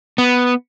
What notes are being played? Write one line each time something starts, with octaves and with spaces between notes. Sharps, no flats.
B3